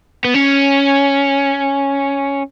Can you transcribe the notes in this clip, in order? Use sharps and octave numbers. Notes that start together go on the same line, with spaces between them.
B3
C#4